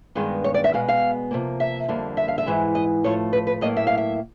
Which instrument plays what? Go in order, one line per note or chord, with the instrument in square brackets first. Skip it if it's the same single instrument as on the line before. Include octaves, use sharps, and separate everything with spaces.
[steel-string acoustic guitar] G2 D#3 G#3 B3
C#5
D5
E5
B2 G#3 B3 F5
F5
C3 F3 A#3
E5
F2 D3 G3 A#3
E5
F5
E5
G#2 E3 G#3
D#5
A2 F3 A3 C#5
B4
B4
A2 F#3 A#3 D#5
E5
F5
E5